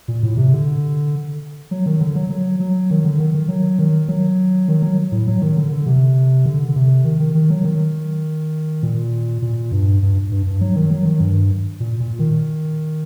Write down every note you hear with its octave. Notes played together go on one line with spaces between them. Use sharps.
A#2
A2
C3
D3
F#3
D#3
D3
F#3
F#3
F#3
D#3
D3
D#3
D#3
F#3
D#3
F#3
D#3
F#3
A2
F#3
D#3
D3
D3
C3
D3
D3
C3
D#3
D#3
D#3
F#3
D#3
A#2
A#2
G2
G2
G2
G2
F#3
D#3
F#3
D#3
G2
A#2
A#2
D#3